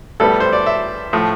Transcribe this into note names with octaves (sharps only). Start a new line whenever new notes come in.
A2 G3 B3 A4
C5
D5
E5
A2 F3 A3